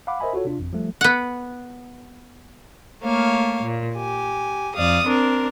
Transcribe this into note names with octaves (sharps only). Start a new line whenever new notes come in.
F5 F#5 B5 D6
A#4 C5 D#5 E5 G#5 B5
F4 F#4 A4 C#5
C3 D4 F4
G#1 F2
F3 G3 A3
B3 F#5
A3 A#3 C#5 F5
A#2
G4 G#5
F2 D5 F5 D#6
C4 D4 A#4